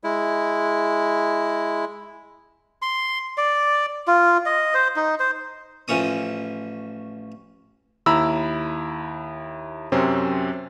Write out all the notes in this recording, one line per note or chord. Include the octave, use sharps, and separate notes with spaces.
G#3 E4
C6
D5
F4
D#5
C5
D#4
C5
A1 F3 C#4 D#6
D#2 E4 A#5 B5 E6
F#2 C3 C4 C#4